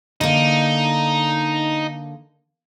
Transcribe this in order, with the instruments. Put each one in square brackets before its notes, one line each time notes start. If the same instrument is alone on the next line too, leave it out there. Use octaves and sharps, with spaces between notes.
[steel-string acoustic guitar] D3 A#3 [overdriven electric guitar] D#4